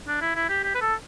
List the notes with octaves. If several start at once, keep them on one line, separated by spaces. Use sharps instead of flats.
D4
E4
E4
G4
G4
B4
A4